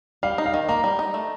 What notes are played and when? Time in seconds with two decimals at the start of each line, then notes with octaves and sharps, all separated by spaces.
0.23 G3 F5
0.38 D#4
0.46 F5
0.53 D#3
0.69 A#3 A#5
0.84 G3
0.99 D#4
1.14 A3